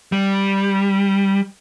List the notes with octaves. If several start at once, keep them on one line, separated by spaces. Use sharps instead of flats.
G3